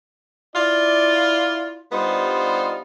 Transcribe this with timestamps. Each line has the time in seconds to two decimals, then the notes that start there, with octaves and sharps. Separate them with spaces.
0.56 E4 F4 D5
1.92 G2 G3 B3 D#4 F4 C5